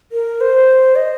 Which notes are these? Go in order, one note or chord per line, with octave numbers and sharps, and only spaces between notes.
A#4
C5
D#5